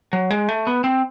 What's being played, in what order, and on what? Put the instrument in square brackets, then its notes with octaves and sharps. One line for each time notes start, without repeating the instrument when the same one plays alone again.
[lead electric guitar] F#3
G#3
A3
B3
C4